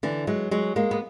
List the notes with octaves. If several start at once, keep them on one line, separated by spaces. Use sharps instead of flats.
D3 E3
F#3 G#3
F#3 G#3
G#3 A#3
B3